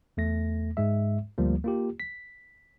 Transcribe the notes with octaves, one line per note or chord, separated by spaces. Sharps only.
E2 A3 A#6
G#2 G#3 E5
D2 F3 G3 A#3
A#3 F4 G4
B6